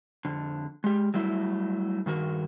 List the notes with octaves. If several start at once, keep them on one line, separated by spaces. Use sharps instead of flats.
F2 D3
G#3 G4
F#3 G3 A3 E4
G2 D#3 F#4 A#4